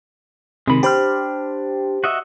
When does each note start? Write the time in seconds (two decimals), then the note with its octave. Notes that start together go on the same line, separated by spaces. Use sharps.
0.68 C3 D#3 G#3 B5
0.83 D4 G4 C5 B5 F6
2.04 F#4 D#5 E5